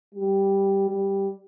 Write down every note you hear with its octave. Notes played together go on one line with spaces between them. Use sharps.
G3
G3